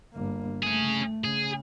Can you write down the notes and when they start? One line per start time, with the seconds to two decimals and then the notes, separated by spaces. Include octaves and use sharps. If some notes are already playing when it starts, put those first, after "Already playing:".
0.13 G1 A#3
0.63 A3 C#4 G#4
1.24 C#3 G#4